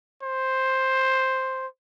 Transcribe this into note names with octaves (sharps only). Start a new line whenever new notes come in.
C5